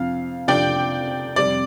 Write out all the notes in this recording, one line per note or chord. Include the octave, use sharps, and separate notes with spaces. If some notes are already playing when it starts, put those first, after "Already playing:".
Already playing: F2 C3 F3 D4 F5
F2 C3 F3 D4 G4 D5 G5
F2 C3 G3 D5